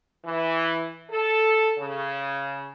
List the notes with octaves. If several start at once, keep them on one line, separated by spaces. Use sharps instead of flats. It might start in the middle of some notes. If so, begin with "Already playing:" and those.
E3
A4
C#3